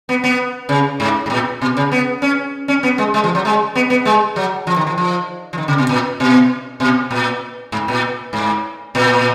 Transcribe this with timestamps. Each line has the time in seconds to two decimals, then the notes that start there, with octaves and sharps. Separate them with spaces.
0.09 B3
0.24 B3
0.69 C#3
1.00 G#2
1.26 G#2
1.30 A#2
1.61 B2
1.77 C#3
1.92 B3
2.22 C#4
2.68 C#4
2.83 B3
2.98 G#3
3.14 G#3
3.24 F3
3.35 F#3
3.45 G#3
3.75 B3
3.90 B3
4.05 G#3
4.36 F#3
4.67 F3
4.76 D#3
4.87 F3
4.98 F3
5.53 F3
5.58 D#3
5.68 C#3
5.78 B2
5.89 A#2
6.20 B2
6.80 B2
7.11 A#2
7.72 G#2
7.88 A#2
8.33 G#2
8.95 A#2